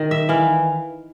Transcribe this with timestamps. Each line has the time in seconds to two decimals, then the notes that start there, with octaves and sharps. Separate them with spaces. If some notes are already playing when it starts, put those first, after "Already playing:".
Already playing: D#3
0.11 E5
0.29 E3 F5